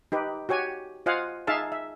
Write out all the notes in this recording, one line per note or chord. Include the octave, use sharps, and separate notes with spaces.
D#4 G4 B4
F#4 G4 C#5 G#5
F4 C5 D#5 F5 F#5 G#5
D#4 G#4 E5 F5 A5
E5